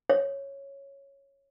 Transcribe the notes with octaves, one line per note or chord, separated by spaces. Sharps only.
C#5